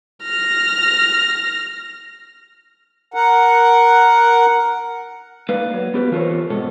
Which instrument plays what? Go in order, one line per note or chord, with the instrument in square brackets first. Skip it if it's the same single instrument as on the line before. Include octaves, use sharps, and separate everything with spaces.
[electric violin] F6 A#6
[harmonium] A#4 F#5
[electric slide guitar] A#3 D#4 B4 D5 F5
F#3
B3 G4 B4
E3 F4 A4 A#4 C5 C#5
G#2 B2 A4